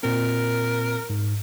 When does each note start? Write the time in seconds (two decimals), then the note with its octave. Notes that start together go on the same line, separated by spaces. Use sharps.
0.03 A#2 C4 A#4
1.10 G#2